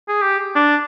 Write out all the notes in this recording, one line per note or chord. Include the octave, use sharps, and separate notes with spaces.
G#4
G4
D4